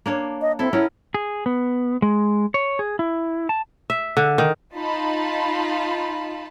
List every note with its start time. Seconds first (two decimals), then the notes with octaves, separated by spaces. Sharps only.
0.06 A#3 D4 C#5
0.42 D#5
0.59 C4 E4 A4
0.73 B3 C#4 E4 A#4
1.14 G#4
1.46 B3
2.02 G#3
2.54 C#5
2.79 G#4
2.99 E4
3.49 A5
3.90 E5
4.17 D3
4.38 D#3
4.74 D#4 F4 A5 B5